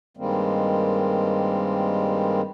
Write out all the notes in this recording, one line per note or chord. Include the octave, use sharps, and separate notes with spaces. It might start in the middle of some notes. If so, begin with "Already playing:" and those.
G2 D#3 G3 G#3 A#3 C4